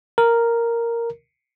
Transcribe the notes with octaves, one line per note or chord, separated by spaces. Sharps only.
A#4